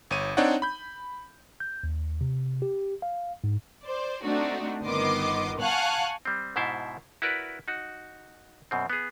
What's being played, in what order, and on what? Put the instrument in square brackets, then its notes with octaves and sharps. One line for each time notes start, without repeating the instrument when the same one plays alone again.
[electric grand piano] G1 C#5 D#7
C4 D4 D#4 C#5 D5 F#5
B5 G6
[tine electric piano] G6
D#2
C3
G4
F5
G#2
[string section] C5 D5
A3 C4 D4 D#4 F#4
G1 D#3 B3 D#5 C6 D6
F5 F#5 G#5 A5 C#6 F#6
[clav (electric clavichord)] G3 C4
G#2 B2 E4 C5 E5 A5
E4 F#4 A#4 B4 D5
D#4 F#4
F#2 B2 C4
B3 G#4